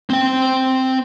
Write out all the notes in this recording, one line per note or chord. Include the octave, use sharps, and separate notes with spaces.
C4 G5